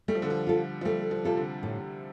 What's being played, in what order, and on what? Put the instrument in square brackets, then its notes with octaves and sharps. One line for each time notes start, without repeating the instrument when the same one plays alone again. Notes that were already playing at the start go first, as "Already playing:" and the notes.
[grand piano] G3 [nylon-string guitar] A3
[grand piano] F3
D3
F3
[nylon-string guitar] F4 A4
[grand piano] F3
[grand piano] G3 [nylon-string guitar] A3
[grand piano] F3
[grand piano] C3 [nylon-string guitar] F4 A4
[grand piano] D3
[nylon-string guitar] A2